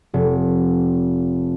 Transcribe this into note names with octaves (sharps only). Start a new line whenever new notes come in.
F1